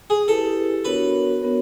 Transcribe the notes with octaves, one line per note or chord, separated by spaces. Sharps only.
G#4
E4 G4 A4 B4
B3 D4 F#4 A#4 B4 C#5
B3 D4 F#4 A#4 C#5